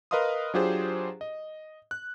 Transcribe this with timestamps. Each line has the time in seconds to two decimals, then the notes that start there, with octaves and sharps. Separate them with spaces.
0.11 A#4 B4 D#5 F5 C6 D#6
0.54 F#3 D4 F4 G4 G#4 C5
1.21 D#5
1.91 F#6